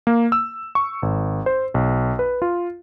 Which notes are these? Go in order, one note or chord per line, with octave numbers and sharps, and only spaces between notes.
A#3
E6
C#6
G#1
C5
B1
B4
F4